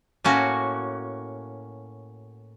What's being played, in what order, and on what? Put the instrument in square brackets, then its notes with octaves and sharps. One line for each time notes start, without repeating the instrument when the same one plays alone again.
[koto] A2 A#3 C#4 F#4